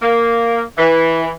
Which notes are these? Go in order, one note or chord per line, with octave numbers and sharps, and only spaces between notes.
A#3
E3